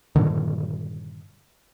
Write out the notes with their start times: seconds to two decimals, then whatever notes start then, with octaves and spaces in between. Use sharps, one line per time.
0.16 G2 A#2 D3 D#3